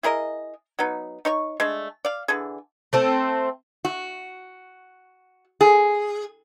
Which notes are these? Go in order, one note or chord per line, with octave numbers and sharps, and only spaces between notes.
E4 G#4 A#4 D#5
F#3 B3 D#4
D#4 C#5 C#6
G#3 A3 D4
D5 F5
D3 E3 G#4
A3 C4 A4
F#4
G#4